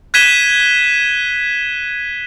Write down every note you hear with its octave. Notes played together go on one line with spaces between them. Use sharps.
F#6 G#6 B6 D#7 E7 G7